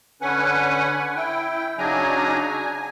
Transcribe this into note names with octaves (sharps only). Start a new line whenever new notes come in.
D3 C#4 B4 F#5 G#5
E4 G5
C#3 F#3 D4 D#4 G#5 A#5
G#5